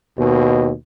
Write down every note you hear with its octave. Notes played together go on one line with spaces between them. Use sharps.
D#2 B2